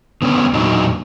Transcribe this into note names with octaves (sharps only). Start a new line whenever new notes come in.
D3 B3 C#4 D4
E2 A#2 F#3 D4 D#4